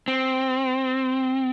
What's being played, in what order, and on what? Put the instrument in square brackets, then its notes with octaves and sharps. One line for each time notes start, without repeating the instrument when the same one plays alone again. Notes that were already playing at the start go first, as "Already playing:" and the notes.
[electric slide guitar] C4